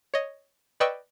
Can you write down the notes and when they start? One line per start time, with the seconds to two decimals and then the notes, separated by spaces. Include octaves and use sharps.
0.14 C#5 D#5
0.80 B4 D5 D#5 G5 C#6 E6